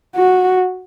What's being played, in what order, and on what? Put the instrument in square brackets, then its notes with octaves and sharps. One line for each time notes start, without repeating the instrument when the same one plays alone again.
[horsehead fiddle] F#4